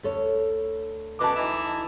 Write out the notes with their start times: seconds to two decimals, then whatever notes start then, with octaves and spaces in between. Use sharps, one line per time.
0.03 D2 A4 C#5
1.19 F#2 B2 A5 D6
1.35 E3 D#4 E4